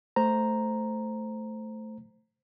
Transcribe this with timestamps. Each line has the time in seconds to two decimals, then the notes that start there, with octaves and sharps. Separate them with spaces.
0.16 A3 C5 A#5